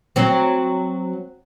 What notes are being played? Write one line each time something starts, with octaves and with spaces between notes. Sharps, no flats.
F#3 C4